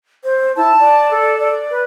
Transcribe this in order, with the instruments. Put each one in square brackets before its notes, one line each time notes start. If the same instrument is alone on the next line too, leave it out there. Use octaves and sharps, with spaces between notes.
[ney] C5
[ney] E4 [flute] A5
[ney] D5
[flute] A4
[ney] D5
[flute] B4